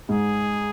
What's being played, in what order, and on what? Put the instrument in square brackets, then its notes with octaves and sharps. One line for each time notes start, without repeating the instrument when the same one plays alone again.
[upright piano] G#2 [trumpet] G#4